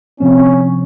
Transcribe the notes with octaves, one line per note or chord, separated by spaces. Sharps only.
C3 F3 C4 C#4